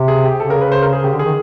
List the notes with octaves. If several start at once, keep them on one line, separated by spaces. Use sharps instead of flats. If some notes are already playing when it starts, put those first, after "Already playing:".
Already playing: C3
G#4
G4
C#3 A4
A#4
B4
C5
A#4
G#4
C#3 G4
D3
G#4
D#3